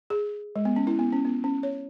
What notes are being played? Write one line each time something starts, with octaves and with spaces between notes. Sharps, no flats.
G#4
G#3
B3
C#4
E4
B3
C#4
B3
C#4
C#5